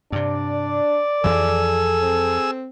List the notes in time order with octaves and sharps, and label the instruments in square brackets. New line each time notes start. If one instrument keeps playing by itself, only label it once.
[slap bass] G2 C3 [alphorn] D4 [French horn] D5
[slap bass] F2 E3 F3 [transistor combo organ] G#4 E6 [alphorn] A4
[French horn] C4